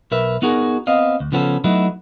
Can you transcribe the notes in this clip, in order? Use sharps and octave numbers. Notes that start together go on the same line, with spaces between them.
B1 A#4 B4 E5
B3 D#4 F#4 G#4 A#4
B3 C4 D#5 F5
D2
C#3 F3 B3 C#4 G4 A4
F#3 A3 B3 D#4 E4 F#4